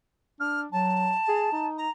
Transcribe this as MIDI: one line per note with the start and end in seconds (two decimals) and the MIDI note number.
0.40 0.66 62
0.40 0.61 89
0.72 1.13 54
0.72 1.67 81
1.28 1.50 68
1.52 1.88 63
1.78 1.91 82